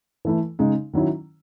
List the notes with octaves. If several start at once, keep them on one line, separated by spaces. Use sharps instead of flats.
E3 A3 E4
C#3 G#3 D#4
D#3 F#3 C#4 E4